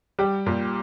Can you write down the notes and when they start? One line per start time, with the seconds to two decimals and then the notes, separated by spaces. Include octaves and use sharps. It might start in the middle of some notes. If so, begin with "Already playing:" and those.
0.19 G3 G4
0.46 A#2